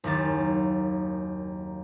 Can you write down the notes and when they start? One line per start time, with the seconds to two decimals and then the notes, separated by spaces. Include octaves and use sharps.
0.04 F#1 D#2 A6